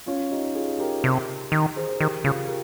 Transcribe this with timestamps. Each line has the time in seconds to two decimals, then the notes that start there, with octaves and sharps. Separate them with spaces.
0.06 C#4 F4
0.30 D#4 G4
0.55 F4 G#4
0.79 G4 A#4
1.04 C3
1.52 D#3
1.76 G#4 C5
2.00 D#3 G4 A#4
2.24 C#3 F4 G#4
2.48 G4 A#4